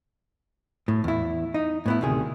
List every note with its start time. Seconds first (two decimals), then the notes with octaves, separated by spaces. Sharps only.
0.88 A2
1.04 E2 E4
1.54 D#4
1.86 A2 B3 E4
2.01 D2 C3 D#3 G#4